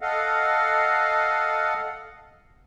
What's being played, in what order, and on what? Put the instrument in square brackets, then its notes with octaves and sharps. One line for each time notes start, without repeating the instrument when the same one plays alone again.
[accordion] A4 D#5 F5 F#5